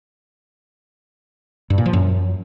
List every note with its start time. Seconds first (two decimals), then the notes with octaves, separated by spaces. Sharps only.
1.70 G2
1.78 A#2
1.86 F3
1.93 F#2